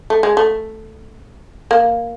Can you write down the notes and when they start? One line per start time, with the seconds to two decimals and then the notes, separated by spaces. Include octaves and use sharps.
0.10 A3
0.23 G#3
0.37 A3
1.71 A#3